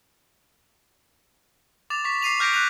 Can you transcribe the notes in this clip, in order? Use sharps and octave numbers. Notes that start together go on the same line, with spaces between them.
D6 A6 E7 F7
C#6 B6
D6 C7 D#7 F7
D6 F6 G6 A#6 B6 D7
F#6 G6 B6 D#7 F7